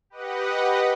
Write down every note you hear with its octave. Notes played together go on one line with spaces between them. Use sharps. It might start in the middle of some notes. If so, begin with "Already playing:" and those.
G4 B4 D#5 F#5